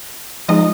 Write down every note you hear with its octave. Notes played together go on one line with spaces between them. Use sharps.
F3 G#3 D#4 D#5